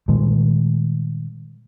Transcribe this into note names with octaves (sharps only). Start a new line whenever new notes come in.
A#2 D#3 G3 G#3